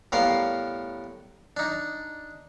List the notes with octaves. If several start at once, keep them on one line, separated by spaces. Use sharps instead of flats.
A2 G3 B3 A#4 F5 C6
D4 D#4